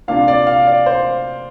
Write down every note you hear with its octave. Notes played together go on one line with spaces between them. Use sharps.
C3 A#3 D4 F4 F5
D5
F5
D5
C5